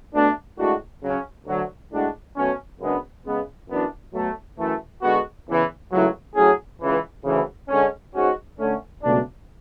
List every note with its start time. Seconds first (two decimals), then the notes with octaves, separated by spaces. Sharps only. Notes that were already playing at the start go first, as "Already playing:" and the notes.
0.12 B2 A3 D4
0.57 A2 G#3 D4 F#4
1.02 C#3 F#3 C#4
1.46 D2 D3 F#3
1.91 A2 G#3 D4 F#4
2.36 B2 F#3 A3 C#4
2.80 F#2 C#3 G#3 B3 D4
3.25 C#3 G#3 B3
3.69 F#2 E3 B3 D4 F#4
4.13 B2 F#3 A3
4.58 F#2 E3 A3
5.02 D3 G#3 B3 F#4
5.47 E2 C#3 E3
5.91 C#2 C#3 F#3 A3 E4
6.35 A2 F#3 C#4 G#4
6.81 C#2 C#3 E3
7.24 D2 C#3 E3
7.68 D3 G#3 C#4
8.13 G#2 G#3 C#4 F#4
8.58 D3 A3 C#4
9.02 C#2 B2 F#3 A3 D4